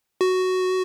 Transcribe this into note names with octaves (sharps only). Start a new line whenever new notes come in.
F#4